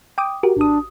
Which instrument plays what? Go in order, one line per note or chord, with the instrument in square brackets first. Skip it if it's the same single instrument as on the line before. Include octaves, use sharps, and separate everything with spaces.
[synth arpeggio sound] G5 D6 D#6
F#4 G4 A#4
[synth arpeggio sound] G#1 D#6 [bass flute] D4